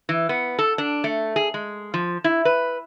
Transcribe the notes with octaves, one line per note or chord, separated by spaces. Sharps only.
E3
B3
A4
D4
A3
G#4
G#3
F3
E4
B4